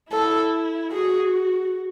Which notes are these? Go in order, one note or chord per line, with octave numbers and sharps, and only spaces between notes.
E4 A4
F#4 G#4